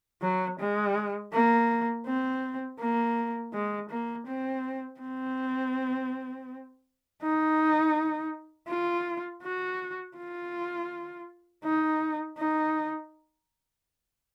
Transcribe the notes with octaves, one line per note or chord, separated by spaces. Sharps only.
F#3
G#3
A#3
C4
A#3
G#3
A#3
C4
C4
D#4
F4
F#4
F4
D#4
D#4